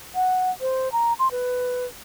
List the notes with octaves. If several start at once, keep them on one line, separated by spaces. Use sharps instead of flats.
F#5
C5
A#5
C6
B4